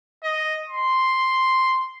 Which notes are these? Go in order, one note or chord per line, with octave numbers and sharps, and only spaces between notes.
D#5
C6